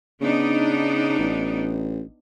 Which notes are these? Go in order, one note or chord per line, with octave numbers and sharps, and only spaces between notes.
C#3 B3 D4 D#4
A1